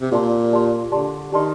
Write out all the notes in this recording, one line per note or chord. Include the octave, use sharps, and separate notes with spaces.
C3
A#2 G4 D5 A5 C6
G4 D5 A5 C6
D3 G4 D5 A5 C6
D#3 G4 D5 A5 C6